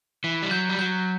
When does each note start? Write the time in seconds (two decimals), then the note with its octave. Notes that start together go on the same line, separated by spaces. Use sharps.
0.24 E3 B6
0.43 G3
0.51 F#3 G6
0.69 G3
0.78 F#3 G6